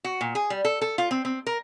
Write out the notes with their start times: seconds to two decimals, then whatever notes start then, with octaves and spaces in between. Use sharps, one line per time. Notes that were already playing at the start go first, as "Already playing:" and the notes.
0.04 F#4
0.21 A#2
0.35 G#4
0.50 G3
0.65 A4
0.81 A4
0.98 F4
1.11 C4
1.25 C4
1.47 A#4